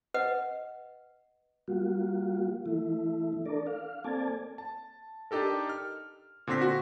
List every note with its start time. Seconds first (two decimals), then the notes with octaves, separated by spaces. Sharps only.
0.14 B4 D#5 F#5
1.68 G3 A#3 F4 F#4
2.66 E3 A3 E4
3.46 D4 A4 A#4 D5
3.67 F5
4.04 A#3 C4 A4 D5 G#5 A5
4.58 A5
5.31 D4 D#4 G4 A4 A#4
5.69 F6
6.47 A#2 D3 C4 C6 A#6 B6
6.61 F#4